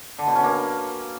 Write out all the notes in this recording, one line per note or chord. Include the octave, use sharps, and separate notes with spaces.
D3
B2
C#4
A#3